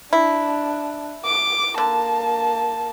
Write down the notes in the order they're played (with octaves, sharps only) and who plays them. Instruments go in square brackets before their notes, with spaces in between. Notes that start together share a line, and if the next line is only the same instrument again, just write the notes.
[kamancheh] D4 [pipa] E4
[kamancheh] D6
[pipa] D3 [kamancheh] A#3 A5